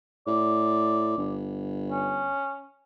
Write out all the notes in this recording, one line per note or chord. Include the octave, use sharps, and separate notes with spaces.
A2 D5
G1
C#4